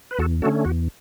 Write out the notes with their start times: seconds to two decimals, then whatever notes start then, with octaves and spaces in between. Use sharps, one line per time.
0.11 B4
0.19 E2 F#4 A4
0.42 D3 A3 C#4 F#4 A4
0.65 E2 F#4